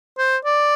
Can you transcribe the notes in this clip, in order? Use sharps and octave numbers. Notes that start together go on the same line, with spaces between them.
C5
D5